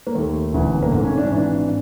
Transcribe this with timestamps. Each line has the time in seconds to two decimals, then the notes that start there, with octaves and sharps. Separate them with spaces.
0.07 A#3
0.15 D#2 D#3 A3
0.53 E1 D2 C#3 E3
0.83 A#3
0.91 G#1 G#2 D#3 A3
1.05 C#4
1.18 D4
1.26 C#4
1.31 G#1 G#2 E3 D4